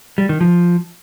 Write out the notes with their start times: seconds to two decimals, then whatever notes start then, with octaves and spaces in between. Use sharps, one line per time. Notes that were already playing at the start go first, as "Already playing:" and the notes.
0.18 G3
0.29 D#3
0.41 F3